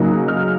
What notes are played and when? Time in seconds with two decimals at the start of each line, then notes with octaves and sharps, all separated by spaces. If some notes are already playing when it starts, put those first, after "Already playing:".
Already playing: C#3 F#3 A#3 D#4
0.28 F6